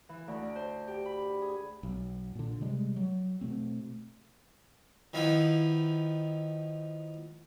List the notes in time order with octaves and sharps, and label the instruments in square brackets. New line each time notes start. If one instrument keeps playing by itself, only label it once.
[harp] E3
D2
D4
C5
G4
B5
G#4
[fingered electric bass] B1
A#2 D3
C3 G3 G#3
F#3
B2 A3 C4
[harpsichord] D#3 F3 B3 E4